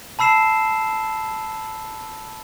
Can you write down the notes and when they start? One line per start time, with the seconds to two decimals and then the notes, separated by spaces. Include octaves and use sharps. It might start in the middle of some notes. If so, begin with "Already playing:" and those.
0.19 A5 B5 E6 C7 E7